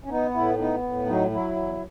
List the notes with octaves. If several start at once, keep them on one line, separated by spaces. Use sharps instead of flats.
C#4
B3 D#4
A2 E4
B3 D#4
A2
F#3 D#4
F#3 E4
E2